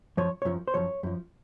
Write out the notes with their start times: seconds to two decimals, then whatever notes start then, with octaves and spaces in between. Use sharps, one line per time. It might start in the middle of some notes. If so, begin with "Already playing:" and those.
0.17 F#2 F3 C#5
0.42 F#2 F3 C#5
0.68 C5
0.74 F#2 F3 C#5
1.03 F#2 F3